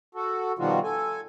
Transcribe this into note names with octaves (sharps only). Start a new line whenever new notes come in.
F#4 A4
B2 D#3 F3 G3 F4 F#4
A4 G#5